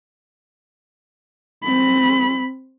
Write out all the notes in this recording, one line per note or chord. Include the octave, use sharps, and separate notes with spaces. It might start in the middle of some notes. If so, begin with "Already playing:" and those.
C4 B5